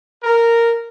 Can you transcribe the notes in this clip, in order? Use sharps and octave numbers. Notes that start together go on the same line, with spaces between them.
A#4